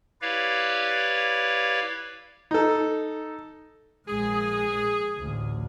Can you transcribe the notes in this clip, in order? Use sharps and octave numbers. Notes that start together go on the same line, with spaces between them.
E4 G4 B4 C#5 D5 F5
D#4 A4
A#1 G#3 G#4
A1 D2